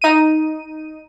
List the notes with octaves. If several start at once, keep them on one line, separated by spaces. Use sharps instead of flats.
D#4 D#7